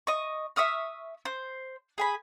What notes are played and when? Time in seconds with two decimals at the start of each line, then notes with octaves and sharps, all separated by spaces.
0.07 D#5 C#6
0.56 E5 C#6 D#6 F6
1.25 C5
1.98 G#4 G#5 B5